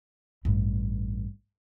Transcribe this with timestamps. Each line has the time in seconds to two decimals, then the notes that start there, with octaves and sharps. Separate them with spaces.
0.45 A1 G2